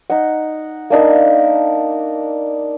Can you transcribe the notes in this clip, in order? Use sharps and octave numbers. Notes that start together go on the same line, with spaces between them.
D#4 F#5
A#3 D4 D#4 A#4